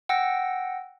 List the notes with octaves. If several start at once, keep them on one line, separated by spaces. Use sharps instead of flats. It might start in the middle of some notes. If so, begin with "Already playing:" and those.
F#5 G5 E6 A#6